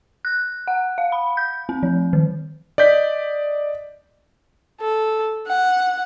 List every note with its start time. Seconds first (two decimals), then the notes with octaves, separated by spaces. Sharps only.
0.25 F#6
0.68 F#5
0.98 F5
1.12 B5
1.37 G6
1.69 C4
1.83 F3
2.13 D#3
2.78 D5 D#5 G6 B6
4.81 A4
5.48 F#5